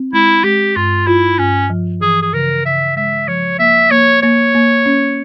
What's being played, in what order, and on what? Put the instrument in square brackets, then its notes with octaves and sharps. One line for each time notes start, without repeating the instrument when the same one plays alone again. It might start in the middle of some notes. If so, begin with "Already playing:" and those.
Already playing: [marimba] C4
[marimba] G#3 [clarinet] E4
[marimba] G#3 [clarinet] G4
[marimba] G2 [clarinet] F4
[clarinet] E4 [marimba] F4
[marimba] G2 [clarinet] C#4
[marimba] F3
[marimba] E3 [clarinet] G#4
[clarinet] G#4
[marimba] C#3 [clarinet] A#4
[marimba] C#3 [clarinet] E5
[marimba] G#3 [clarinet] E5
[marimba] F3 [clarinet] C#5
[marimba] A#3 [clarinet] E5
[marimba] A#3 [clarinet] C#5
[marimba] A#3 [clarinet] C#5
[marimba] A#3
C#4